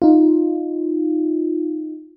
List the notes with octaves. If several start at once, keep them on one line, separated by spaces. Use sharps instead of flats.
D#4 F4